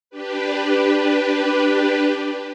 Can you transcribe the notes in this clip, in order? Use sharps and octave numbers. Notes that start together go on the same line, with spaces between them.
D4 G4 B4